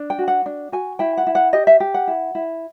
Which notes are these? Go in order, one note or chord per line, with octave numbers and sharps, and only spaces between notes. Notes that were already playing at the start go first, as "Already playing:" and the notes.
Already playing: D4
G5
F#4
F#5
D4
F#4 G#5
E4 G5
F#5
E4
F#5
G4 D#5
E5
G4
F#5
E4
E4